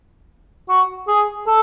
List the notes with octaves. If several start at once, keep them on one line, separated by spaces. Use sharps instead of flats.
F#4
G#4
A4